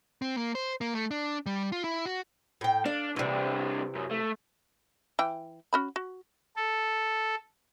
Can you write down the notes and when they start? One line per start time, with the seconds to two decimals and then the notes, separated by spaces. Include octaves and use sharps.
0.22 C4
0.37 A#3
0.55 C5
0.81 A#3
0.95 A3
1.11 D4
1.46 G3
1.72 F4
1.84 E4
2.06 F#4
2.61 A2 G5
2.86 D4 F5
3.16 C2 C3 E3 D4
3.95 F#2
4.11 A3
5.19 E3 G5
5.73 C#4 F#4 B5
5.96 F#4
6.56 A4